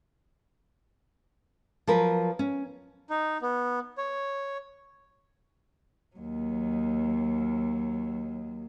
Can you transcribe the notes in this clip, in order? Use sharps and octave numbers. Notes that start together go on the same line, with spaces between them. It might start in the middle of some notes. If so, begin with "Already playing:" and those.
F3 F#3 A#4 B4
C#4
D#4
B3
C#5
D#2 F#3